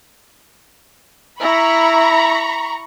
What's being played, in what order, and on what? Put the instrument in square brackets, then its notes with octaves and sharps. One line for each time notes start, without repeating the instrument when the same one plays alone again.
[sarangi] E4 [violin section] A#5 B5 C#6